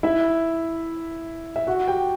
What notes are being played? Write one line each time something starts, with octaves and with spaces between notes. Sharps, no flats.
E4 E5
E5
F#4 F#5
G4 G5